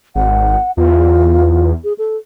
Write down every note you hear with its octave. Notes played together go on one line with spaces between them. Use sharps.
G#1 F#5
E2 F4
G#4
A4